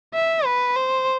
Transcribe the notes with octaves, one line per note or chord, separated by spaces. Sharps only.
E5
B4
C5